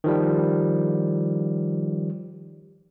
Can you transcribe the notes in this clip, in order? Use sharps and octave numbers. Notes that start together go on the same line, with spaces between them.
D#3 F3 G3